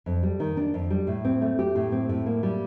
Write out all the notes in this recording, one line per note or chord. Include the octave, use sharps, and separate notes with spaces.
F2
G3
D#3
D4
F2
G3
A2
C4
A3
G4
A2
C4
A2
A#3
G3